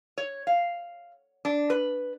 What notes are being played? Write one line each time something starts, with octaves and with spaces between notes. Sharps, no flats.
C#5
F5
D4
B4